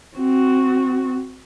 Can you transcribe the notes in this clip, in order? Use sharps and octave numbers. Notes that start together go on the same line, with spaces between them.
C4 F#4